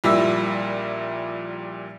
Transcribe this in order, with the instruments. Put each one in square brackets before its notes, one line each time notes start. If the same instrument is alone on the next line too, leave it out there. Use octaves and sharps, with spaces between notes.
[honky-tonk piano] A#1 A#2 G3 E4 E5 E6